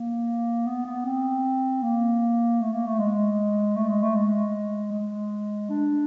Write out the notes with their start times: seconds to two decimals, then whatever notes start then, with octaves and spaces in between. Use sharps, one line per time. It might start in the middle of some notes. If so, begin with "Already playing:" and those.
Already playing: A#3
0.66 B3
0.85 B3
1.05 C4
1.82 A#3
2.60 A3
2.72 A#3
2.86 A3
2.98 G#3
3.76 A3
3.89 G#3
4.02 A3
4.15 G#3
4.92 G#3
5.69 D4